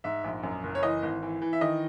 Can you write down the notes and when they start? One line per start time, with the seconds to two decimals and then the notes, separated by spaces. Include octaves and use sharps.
0.04 G#2 E5
0.24 A#1
0.43 F#2
0.63 F#1
0.75 C#5
0.83 E3 D#5
1.03 G#1
1.22 E3
1.42 E3
1.53 E5
1.61 D#3 D#5